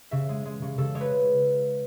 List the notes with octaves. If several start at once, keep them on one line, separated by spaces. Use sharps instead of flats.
C#3 E5
G#3
G#3
C#3
C#3 A4
G#3 C#5
B4